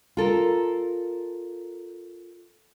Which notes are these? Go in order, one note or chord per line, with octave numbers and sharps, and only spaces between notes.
F4 A4 A#4